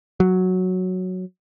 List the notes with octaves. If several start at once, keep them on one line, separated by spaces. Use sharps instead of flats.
F#3